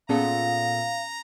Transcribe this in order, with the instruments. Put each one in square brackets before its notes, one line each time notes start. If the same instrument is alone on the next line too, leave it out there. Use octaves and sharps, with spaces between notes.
[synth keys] A#2 B3 A4 [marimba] C#4 G#4 A5 [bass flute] F5 [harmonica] A#5